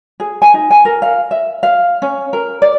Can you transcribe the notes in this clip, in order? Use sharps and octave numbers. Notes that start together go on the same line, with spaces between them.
G#4
G#5
D#4
G#5
A#4
F5
E5
F5
C#4
A#4
D5